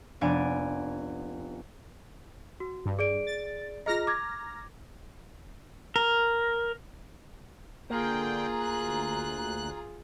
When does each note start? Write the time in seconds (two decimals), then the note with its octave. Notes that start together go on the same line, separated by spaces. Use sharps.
0.21 F1 B3 D4 D5 G#5 D7
2.60 F#4
2.86 G2
2.99 G#4 D5 D7
3.27 A6
3.86 F4 G#4 D#5 A#5 F6 A#6
4.07 D6 G#6
5.96 A#4
7.90 D3 A#3 F4 G#4 G5 A#5
8.60 D2 F#6